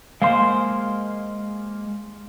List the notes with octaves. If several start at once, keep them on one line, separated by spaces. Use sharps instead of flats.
G#3 A#3 C5 F5 C6